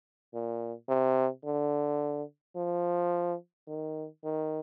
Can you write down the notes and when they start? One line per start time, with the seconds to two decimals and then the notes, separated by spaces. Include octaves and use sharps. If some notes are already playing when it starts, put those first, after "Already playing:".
0.34 A#2
0.89 C3
1.45 D3
2.56 F3
3.68 D#3
4.24 D#3